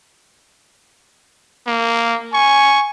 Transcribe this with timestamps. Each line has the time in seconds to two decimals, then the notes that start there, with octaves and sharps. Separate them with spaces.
1.67 A#3
2.34 G#5 C#6